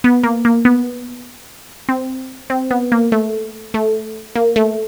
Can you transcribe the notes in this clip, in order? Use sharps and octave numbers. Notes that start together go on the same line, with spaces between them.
B3
A#3
A#3
B3
C4
C4
B3
A#3
A3
A3
A#3
A3